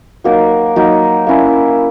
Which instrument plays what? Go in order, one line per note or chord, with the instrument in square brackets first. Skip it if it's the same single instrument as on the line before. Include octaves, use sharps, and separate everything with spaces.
[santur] F#3 A#3 D#4 A#4
F#3 A#3 D#4 A#4
A#3 C#4 E4